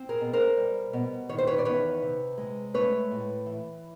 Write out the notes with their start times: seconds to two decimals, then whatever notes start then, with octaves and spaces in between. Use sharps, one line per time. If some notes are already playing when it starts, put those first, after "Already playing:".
Already playing: C4
0.09 G#4 A#4
0.21 B2
0.33 A#4 C5
0.57 G3
0.93 B2
1.29 D#3 C#5
1.38 C5
1.47 B4 C#5
1.58 D5
1.65 E2 B4 C#5
2.02 C3
2.38 G#3
2.74 A3 B4 C#5
3.11 A2
3.46 E3